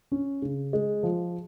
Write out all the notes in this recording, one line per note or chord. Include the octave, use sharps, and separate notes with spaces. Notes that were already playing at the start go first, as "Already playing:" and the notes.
C#4
C#3
G#3
F3